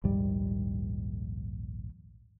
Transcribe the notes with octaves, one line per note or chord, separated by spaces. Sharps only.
A#1 D#2 G#2 G3